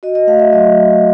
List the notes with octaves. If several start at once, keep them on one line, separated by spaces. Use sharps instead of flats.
F#4 D#5
D#5
A3 F5
E5
F#3 D#5